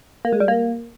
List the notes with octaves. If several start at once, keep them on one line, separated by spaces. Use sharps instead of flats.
A#3
G#3
G3
A#3